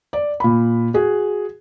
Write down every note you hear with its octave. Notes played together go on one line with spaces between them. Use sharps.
D5
A#2 B5
F#4 G#4